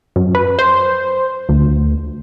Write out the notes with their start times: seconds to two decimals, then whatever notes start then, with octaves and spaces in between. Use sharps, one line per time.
0.16 F#2
0.35 B4
0.59 C5
1.49 D2